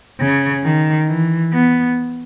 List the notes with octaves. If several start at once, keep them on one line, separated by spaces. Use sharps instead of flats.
C#3
D#3
E3
B3